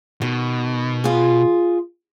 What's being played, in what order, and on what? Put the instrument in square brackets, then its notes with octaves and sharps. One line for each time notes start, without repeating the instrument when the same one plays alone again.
[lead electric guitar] B2 [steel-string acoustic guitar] D#3
[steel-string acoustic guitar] F4 G#4